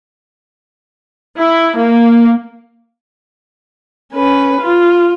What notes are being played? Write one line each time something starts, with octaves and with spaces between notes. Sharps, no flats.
E4
A#3
C#4 B4
F4